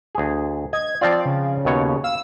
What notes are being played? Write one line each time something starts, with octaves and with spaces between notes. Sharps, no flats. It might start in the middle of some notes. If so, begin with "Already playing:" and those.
D2 G#4
D#5 G#6
F3 C4 F4 D5
C#3
D#2 B2 C#5
F5 E6